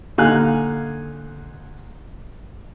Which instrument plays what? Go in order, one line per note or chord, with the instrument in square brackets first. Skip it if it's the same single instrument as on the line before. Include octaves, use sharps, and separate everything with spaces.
[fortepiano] A#2 D3 D#4 F5 G#5 F#6